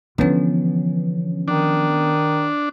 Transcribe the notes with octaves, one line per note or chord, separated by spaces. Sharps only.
D3 E3 F3 B3 C#4
D#3 D4